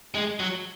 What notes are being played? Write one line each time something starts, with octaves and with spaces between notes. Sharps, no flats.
G#3
F#3